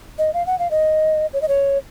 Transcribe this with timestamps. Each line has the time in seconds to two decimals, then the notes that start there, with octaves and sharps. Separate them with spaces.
0.18 D#5
0.34 F5
0.47 F#5
0.59 F5
0.71 D#5
1.33 C#5
1.42 D#5
1.48 C#5